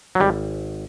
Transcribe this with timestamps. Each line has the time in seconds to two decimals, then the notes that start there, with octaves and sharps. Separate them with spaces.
0.15 F#3
0.20 G#1 G3